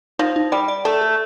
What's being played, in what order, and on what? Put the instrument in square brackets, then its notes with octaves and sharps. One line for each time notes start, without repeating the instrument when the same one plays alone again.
[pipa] F3 [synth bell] D#4
[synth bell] D#4
[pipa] G3 [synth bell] D5
[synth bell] D5
[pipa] A3 [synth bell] A4
[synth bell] A4